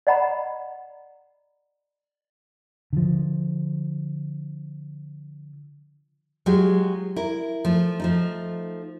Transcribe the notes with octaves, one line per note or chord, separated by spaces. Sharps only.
D5 D#5 F#5 A#5 B5
D3 F3
F#3 G#3 F4 G4
E4 A#4
F3 A3
F3 A3 D#4